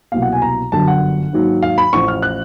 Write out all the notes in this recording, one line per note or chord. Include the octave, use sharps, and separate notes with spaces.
C2 B2 F#3 A#3 F5
F#5
G#5
A#5
G1 F#2 D3 F#3 A5
F#5
G#2 D#3 F#3 A#3
F5
B5
A1 A2 F3 C#6
F6
F#6